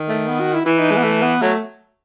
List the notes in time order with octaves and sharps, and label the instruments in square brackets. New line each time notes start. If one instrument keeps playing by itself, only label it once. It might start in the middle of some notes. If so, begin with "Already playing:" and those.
Already playing: [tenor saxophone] D#3
[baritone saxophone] A3
B3
F#4
E4
[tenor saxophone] E3 [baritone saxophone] E4
[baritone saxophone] D#4
G#3
B3
A3
B3
[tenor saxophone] F#3 [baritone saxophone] A3